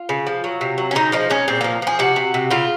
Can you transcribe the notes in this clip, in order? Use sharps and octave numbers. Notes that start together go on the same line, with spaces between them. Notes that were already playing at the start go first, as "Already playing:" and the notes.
Already playing: F4
C#3
F3
F#3
C3
F#3
C#4
C#3 D#4
F3 D#4
G#3 C#4
A#2 C4
F3 A#3
F3 G#4
C3 F#4
C3
C3
C#3 F4